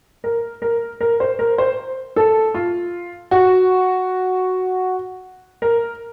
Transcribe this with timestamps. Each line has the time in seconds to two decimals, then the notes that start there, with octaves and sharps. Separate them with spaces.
0.24 A#4
0.62 A#4
1.01 A#4
1.20 C5
1.39 A#4
1.58 C5
2.16 A4
2.54 F4
3.31 F#4
5.62 A#4